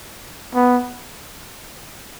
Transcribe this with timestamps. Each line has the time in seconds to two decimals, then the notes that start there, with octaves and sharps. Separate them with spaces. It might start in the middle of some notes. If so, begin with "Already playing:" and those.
0.55 B3